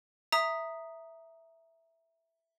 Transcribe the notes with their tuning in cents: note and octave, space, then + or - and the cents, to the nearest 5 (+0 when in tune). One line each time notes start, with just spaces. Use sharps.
E5 +0 A#5 +0 D#6 +0